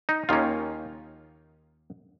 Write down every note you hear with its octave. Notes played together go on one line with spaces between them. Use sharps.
D#4
D#2 D#3 A#3 C#4 F4